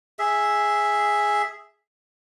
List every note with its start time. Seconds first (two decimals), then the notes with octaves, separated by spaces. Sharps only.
0.19 G#4 E5